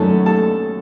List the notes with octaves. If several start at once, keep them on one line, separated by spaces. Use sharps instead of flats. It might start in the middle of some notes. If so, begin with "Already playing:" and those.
Already playing: F#2 D#3 A3 C#4 A4 A5
A4 A5